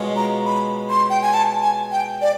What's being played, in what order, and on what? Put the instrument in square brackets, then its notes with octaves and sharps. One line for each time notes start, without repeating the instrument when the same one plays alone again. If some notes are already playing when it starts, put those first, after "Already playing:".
Already playing: [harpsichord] B2 G#3 C#4 F4
[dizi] A#5
B5
C6
G5
G#5
A5
G#5
G5
D5